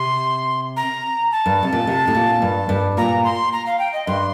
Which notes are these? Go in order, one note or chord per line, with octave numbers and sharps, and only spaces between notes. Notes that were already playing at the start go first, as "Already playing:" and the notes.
Already playing: C3 C6
A#5
A5
G2
C3
A#2
C3
A2
A#2
G2
G2
A#2 A#5
C6
A#5
F5
G5
D#5
G2 C6